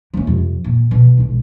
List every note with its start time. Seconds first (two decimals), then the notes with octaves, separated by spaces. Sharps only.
0.14 A#3 C#4
0.27 F2 C3
0.64 A#2
0.91 B2
1.18 B1 G#3